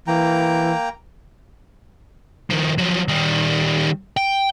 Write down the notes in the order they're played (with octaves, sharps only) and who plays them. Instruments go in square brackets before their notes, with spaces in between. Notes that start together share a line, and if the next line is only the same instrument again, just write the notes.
[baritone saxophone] E3 [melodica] A#3 G5 A#5
[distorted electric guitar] D#3 F3
F3 F#3
D#3 G3
G5